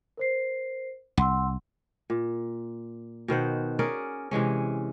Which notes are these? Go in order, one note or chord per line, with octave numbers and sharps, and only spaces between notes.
A#4 C5 C7
C2 F#5 C6 E6
A#2
B2 D#3 C5 F#5
C#4 G#4 A#4 D5
C3 E3 G#3 C#4